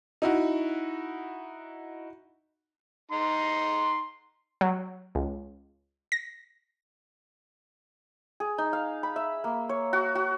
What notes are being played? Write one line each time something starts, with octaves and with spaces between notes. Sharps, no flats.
D#4 E4 F#4
D#4 A#5 C6
F#3
C#2
A#6
G#4
D#4
F5
B5
E5
A#3
C#5
F#4
F#4